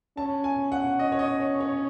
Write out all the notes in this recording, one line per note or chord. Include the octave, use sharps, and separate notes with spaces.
C#4 A5
G#5
F#5
D#5
C#5
D#5
C#5
C#5